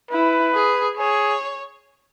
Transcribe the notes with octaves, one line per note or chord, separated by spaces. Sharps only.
E4 B4
G#4
G#4 C#5